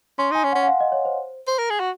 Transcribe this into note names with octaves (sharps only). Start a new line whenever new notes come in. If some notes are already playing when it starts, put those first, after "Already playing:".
C#4 C6
D#4 G#5
C#4
F#5
C#4
F#5
F5
D#5
C#5
C5
C5
A#4
G#4
F#4